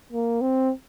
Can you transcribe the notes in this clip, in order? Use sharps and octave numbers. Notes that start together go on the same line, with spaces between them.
A#3
C4